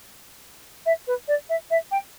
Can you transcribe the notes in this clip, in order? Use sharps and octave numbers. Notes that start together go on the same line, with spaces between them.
E5
B4
D5
E5
E5
G5